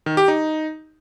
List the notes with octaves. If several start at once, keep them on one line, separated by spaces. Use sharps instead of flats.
D#3
G4
D#4